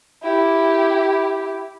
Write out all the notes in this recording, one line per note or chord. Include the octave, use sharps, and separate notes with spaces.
E4 G4